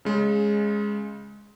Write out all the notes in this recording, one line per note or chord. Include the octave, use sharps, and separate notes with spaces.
C#3 G#3